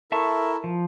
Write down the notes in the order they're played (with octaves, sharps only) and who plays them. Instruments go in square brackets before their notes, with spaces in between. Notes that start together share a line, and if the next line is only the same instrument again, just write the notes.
[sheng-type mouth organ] E4 A4 A#4 [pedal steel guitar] E5 A5 C#6
[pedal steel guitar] F3